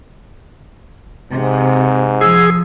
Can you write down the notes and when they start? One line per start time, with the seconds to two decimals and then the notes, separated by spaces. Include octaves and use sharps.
1.32 G#2 C3
2.21 F3 G#4 E6